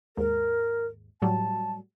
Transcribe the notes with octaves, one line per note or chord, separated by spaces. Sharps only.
D#2 G#2 A#4
A2 F#3 G3 A5